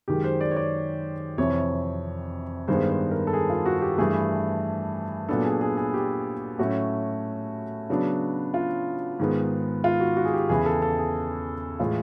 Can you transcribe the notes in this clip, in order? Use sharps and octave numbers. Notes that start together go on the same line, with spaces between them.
F#2 D#3 G#3 G4
C5
D5
C#5
D5
F2 C3 E3 C#5
G2 D#3 G#3 B3 C5
C5
A#4
A4
G#4
F4
F#4
G4
G2 E3 A3 G#4
A#2 F#3 B3 D4 A4
G#4
G#4
G#4
G4
A2 F#3 A3 C#4 F#4
C#3 F#3 B3 D4
F4
G#2 D#3 G#3 B3
F4
F#4
F#4
G#4
G4
E2 C#3 E3 G#4
A4
A4
G#4
A2 E3 G#3 F4